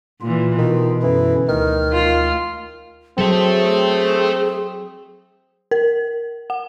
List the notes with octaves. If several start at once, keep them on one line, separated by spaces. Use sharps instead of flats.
A#2 E3 F4
B2 D#3
F#2 D3 E3 E4
D2 D#3 F6
F4
F#3 C4 G#4 A4 E5
A#4
F#5